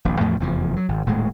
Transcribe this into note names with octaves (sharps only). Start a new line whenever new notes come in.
D#1 A#1
E2 A2 F3 A3
F1 E2 F3
F#3
G#1
D#1 A2 G#3